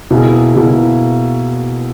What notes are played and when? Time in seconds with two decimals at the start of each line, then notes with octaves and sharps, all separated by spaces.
0.11 B2 A#3 E4 G#4
0.53 B2 A#3 E4 G#4